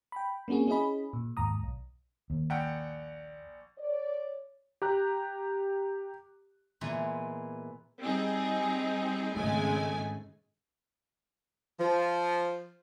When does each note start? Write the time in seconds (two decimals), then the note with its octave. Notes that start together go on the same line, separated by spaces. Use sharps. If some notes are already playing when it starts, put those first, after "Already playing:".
0.12 G5 B5
0.48 A#3 C4 C#4 F#4 G#4
0.68 C#4 E4 G#4 D#5 B5
1.13 A#2
1.37 D#2 G#2 A#5 D#6
1.63 B1
2.30 D#2
2.50 A#1 F#5 G5
3.77 C#5 D5
4.82 G4 A#5 F#6
6.81 A#2 E3 G#3 B3
8.02 G3 C4 D#4 G#4
9.35 G#1 G#2 C#3 G#3 A3 G#5
11.80 F3